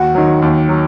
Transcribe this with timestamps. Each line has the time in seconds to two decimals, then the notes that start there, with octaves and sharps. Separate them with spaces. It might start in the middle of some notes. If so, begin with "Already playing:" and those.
Already playing: D#2 F#4
0.15 D#3 F#3
0.42 D#2
0.69 F#3